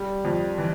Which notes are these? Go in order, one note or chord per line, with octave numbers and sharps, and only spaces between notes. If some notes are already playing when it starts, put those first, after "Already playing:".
Already playing: G3
F2
E3